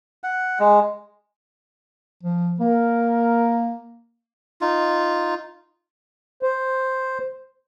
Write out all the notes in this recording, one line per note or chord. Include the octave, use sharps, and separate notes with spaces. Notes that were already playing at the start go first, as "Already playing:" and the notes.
F#5
G#3
F3
A#3 A#4
D#4 F4
C5